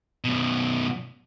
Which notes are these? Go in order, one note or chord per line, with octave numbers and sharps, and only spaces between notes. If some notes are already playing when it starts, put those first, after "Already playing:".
F#2 B2